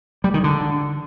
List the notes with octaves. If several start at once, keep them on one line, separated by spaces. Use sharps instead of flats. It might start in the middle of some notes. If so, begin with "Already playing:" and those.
G3
D#3
D3